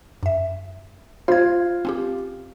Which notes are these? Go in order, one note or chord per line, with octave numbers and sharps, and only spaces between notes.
F#2 E5
F4 C5 G#6
C4 C#4 G4